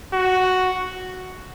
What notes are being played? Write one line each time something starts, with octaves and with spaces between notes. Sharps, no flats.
F#4